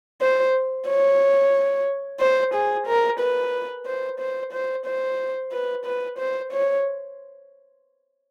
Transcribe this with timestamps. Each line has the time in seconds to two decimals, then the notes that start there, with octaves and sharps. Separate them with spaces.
0.22 C5
0.88 C#5
2.21 C5
2.54 G#4
2.87 A#4
3.20 B4
3.86 C5
4.20 C5
4.53 C5
4.86 C5
5.52 B4
5.85 B4
6.18 C5
6.52 C#5